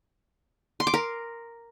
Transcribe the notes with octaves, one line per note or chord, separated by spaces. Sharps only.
C6
D6
A#4